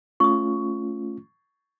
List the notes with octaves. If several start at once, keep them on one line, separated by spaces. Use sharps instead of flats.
A3 C#4 F4 C#6 D#6